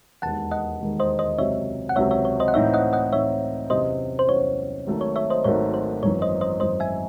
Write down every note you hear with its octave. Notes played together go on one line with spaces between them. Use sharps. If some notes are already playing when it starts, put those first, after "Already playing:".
E1 D#2 D#3 G#3 F#5 A5
D#5 F#5
E1 D#2 D#3 G#3
C5 D#5
C5 D#5
C#2 C3 F#3 C4 C#5 E5
F#5
C#2 C3 F#3 C4 C#5 E5
C#5 E5
C#5
C5 D#5
F#5
A2 E3 C4 D#4 C#5 E5
D#5 F#5
D#5 F#5
A2 E3 C4 D#4 C#5 E5
E2 C3 F#3 C#4 F#4 C5 D#5
C5
E2 C3 F#3 C#4 F#4 C#5
G#1 G#2 D#3 F#3 A3
C#5
C#5 E5
C5 D#5
G#1 G#2 D#3 F#3 A3 C#5
C5
G#1 F#2 E3 C#5
C5 D#5
C5 D#5
G#1 F#2 E3 C5 D#5
E5 G#5